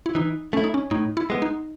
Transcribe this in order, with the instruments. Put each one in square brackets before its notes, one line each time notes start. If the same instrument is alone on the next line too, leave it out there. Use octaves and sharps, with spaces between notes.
[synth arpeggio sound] E4
[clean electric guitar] E3 [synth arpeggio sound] D#4
[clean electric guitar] A3 E4 [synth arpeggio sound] C#4
[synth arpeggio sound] D#4
C#4
[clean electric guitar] A2 [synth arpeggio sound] D#4
[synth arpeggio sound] E4
[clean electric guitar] G#3 B3
[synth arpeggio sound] D#4